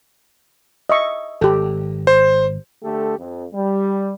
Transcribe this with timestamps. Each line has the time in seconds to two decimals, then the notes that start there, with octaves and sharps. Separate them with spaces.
0.89 D#5 E5 C#6
1.41 G#1 G4 A4
2.07 C5
2.83 D3 A3 G4 A4
3.18 F2
3.54 G3